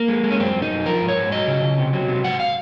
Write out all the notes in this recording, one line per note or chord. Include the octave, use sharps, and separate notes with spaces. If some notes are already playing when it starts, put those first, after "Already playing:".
Already playing: A#3
G#3
G#3
C#4
F#2 C4
F#2
D#4
F#2
F3 A#4
G#2
C#5
G#2
F#3 D#5
C#3
C#3
C3
F#3
C3
G#2 F#5
F5